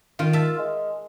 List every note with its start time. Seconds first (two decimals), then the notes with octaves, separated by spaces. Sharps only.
0.19 D#3 F4
0.33 E5 A5
0.58 G#3